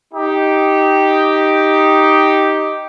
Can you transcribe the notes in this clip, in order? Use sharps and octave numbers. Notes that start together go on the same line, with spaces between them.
D#4 G4